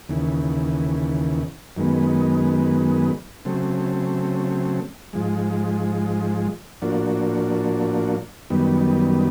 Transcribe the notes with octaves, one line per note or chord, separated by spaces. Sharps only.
D#2 C#3 E3
F#2 D#3 G#3 B3
C#3 F#3 A3 C4
G#2 F3 G#3
A2 F3 A#3 D4 F#4
F#2 D#3 G3 B3